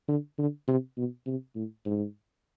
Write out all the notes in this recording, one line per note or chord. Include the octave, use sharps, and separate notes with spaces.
D3
D3
C3
B2
C3
A2
G#2